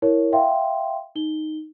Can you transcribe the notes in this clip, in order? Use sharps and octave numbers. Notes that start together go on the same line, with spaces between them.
E4 A#4 C#5
E5 F5 G5 C6
D#4 G7